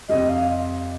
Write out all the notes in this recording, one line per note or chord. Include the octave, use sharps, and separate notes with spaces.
F2 C3 G3 D#5
F5